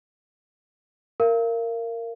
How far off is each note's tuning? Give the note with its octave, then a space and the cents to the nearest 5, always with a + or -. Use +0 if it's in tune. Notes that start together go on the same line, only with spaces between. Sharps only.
A#4 -15 F5 -35